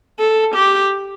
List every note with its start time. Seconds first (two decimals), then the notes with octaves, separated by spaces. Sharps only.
0.19 A4
0.55 G4